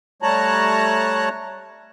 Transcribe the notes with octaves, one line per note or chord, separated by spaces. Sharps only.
G3 A3 C#5 A5 A#5 F#6